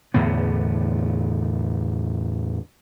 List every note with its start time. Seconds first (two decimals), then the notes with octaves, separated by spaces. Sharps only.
0.14 E2 A2 D3 B3